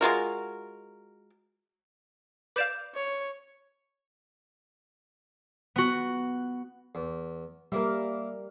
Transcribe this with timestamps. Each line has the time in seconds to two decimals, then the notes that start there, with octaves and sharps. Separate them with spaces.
0.01 G#3 F4 F#4 A#4
2.56 B4 D5 F5 D6 G6 E7
2.95 C#5
5.76 B3 F#4
6.95 E2
7.72 G3 A#3 E4 A#4 E5